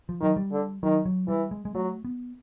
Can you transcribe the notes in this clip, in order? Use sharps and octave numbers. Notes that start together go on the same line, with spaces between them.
F3
D#3 F#3
G3
D3
D#3 F#3
F#3
E3 G3
G#3
G#3
F#3 A3
B3